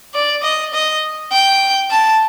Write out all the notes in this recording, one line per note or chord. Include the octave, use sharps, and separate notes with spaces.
D5
D#5
D#5
G5
A5